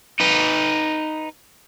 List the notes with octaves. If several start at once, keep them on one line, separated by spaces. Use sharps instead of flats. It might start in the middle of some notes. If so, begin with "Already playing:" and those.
D#4 B4